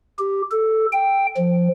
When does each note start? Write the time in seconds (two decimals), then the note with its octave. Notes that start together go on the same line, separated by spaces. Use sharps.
0.19 G4
0.51 A4
0.92 G5
1.37 F3